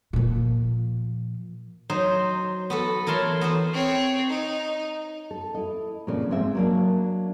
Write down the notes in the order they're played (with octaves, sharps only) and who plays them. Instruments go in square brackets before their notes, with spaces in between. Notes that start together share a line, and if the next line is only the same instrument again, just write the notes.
[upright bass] A#2 F3
[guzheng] F#3 D#4 C5
B3 F#4 A4
E3 E4 A#4 C#5 A5 C6
B3 F#4 C5
[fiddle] C4 C#5
D#4
[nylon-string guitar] A4
E4 D#5
A#2 C#3 F3 C4
G#2 G#3 C4 C5 E5
F#3 A#3 D4